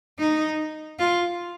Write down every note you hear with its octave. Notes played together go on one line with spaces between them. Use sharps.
D#4
F4